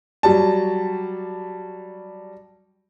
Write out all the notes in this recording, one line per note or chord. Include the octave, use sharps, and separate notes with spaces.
F#3 G3 A5